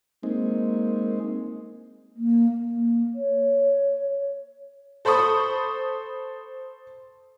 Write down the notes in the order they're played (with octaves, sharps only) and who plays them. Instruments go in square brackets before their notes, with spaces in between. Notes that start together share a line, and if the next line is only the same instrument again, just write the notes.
[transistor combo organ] G#3 C4 D#4 [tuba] A#3
[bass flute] A#3
A#3
C#5
[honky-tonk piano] A4 C5 B5 C#6 D#6